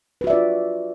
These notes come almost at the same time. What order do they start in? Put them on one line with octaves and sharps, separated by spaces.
B4 F#4 E5 D5 F4